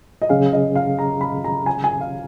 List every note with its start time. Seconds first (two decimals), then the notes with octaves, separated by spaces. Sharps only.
0.22 D#5
0.29 C#3 F#3 C#4 G#4 F5
0.53 D#5
0.75 F5
0.98 A#5
1.21 B5
1.44 A#5
1.66 G#5
1.84 G#5
2.01 F5